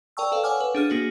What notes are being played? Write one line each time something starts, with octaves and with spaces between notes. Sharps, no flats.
A#4 D5 G5 A5 C#6 E6
A4 B4 F5
C#5 F#5 G#5 D6 F6
B4
D4 G#4 F6 D#7
A#3 F#4 G#4